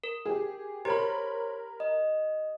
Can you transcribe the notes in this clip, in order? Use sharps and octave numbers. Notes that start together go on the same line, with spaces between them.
A#4
G4 G#4
G4 A#4 C5 C#5 B5 G#6
D#5